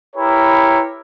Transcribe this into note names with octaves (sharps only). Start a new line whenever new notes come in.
E4 G4 A#4 B4 C#5